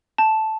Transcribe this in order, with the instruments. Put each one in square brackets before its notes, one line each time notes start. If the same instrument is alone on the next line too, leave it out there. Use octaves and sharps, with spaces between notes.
[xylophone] A5